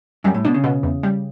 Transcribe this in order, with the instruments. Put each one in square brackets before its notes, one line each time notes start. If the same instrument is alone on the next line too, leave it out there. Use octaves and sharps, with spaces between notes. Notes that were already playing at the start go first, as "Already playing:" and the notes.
[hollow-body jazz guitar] F#2 [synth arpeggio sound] G3
[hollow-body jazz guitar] A2
[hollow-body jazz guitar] B2 [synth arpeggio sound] D4
[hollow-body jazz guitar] C#3
[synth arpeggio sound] B2
E2
G3